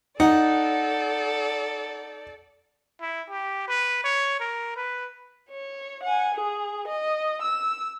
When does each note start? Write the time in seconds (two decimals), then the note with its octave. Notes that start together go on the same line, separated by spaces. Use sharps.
0.20 D#4 A4 D5 F#5
3.01 E4
3.30 G4
3.68 B4
4.04 C#5
4.40 A#4
4.76 B4
5.50 C#5
6.03 F#5 G#5
6.35 G#4
6.88 D#5
7.42 E6